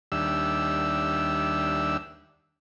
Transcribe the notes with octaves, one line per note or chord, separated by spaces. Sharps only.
D#2 G3 D4 E5 E6